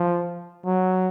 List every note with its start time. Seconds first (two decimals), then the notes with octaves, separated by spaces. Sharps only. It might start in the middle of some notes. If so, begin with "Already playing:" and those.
Already playing: F3
0.65 F#3